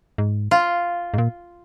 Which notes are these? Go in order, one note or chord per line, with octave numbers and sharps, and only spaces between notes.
G#2
F4
G#2
A#2